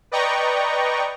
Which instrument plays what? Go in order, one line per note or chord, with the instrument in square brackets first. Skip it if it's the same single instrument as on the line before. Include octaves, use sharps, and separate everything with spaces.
[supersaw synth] B4 D5 D#5 G5 A#5 C#6